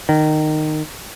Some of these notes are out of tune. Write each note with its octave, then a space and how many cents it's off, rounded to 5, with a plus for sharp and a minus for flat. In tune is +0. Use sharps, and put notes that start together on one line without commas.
D#3 -15